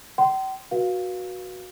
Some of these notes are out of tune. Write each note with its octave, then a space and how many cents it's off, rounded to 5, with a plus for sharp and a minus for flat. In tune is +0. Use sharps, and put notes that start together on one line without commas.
G5 -40 C6 -15
F#4 -10 B4 -30 F5 +10